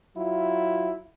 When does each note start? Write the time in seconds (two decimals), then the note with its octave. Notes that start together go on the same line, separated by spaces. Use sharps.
0.16 F#3 E4 F4